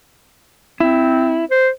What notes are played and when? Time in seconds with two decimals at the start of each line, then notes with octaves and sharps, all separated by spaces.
0.80 C4 E4
1.50 C5